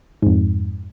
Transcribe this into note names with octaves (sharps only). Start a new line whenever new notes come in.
F2 G#2